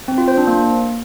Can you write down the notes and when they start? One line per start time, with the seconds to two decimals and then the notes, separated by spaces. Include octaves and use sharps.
0.08 C4
0.18 F4
0.28 C5
0.37 D4
0.47 A#3